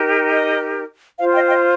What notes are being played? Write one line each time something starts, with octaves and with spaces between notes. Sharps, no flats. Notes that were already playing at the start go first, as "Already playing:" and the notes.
Already playing: D#4 G4 A#4
D#5
F4 C5 F5
D#5 G5
D#5 G5